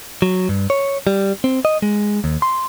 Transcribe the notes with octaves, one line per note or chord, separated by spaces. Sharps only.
F#3
G2
C#5
G3
C4
D#5
G#3
D#2
C6